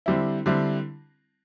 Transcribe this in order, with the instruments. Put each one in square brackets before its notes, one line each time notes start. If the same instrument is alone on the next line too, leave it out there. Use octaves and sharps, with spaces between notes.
[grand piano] D3 G3 C4 E4
D3 G3 C4 E4